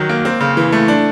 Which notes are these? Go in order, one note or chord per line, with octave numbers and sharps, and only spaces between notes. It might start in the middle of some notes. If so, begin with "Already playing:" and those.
Already playing: D#3 F#3 D#4
A#3
C4
C#3
E3
A3
D4